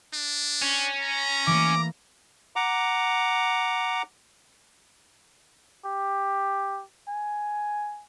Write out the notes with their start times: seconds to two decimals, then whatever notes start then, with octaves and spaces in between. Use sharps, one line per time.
0.14 D4
0.62 C#4 C#7
1.02 A#5
1.47 E3 A3 A#3 D6
2.56 F#5 A#5 D6
5.85 G4
7.08 G#5